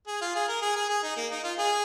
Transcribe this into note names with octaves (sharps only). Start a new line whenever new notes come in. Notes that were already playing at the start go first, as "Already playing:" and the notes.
G#4
F4
G#4
A#4
G#4
G#4
G#4
D#4
A#3
D#4
F4
G#4